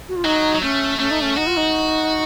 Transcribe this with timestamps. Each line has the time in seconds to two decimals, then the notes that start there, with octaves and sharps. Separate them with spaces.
0.09 F#4
0.16 F4
0.25 F#3 D#4
0.55 F#3
0.62 A3 C#4
0.99 A3 C#4
1.11 D#4
1.22 C#4
1.37 D#4 F#4
1.47 F4
1.57 D#4